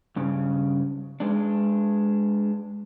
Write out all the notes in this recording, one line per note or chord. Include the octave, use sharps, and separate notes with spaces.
G2 C#3
G#3 D4